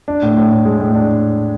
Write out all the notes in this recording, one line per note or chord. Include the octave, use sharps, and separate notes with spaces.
D4
A2
A2
A2
G#3
A2
D4